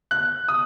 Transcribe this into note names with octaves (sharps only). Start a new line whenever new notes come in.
F#6
D#6